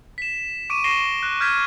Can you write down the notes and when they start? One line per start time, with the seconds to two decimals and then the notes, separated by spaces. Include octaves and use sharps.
0.18 B6 E7
0.70 C#6 D6 D7 D#7
0.84 C#6 A#6 C7 D7 E7 G7
1.23 F#6
1.40 F6 G6 G#6 B6 D#7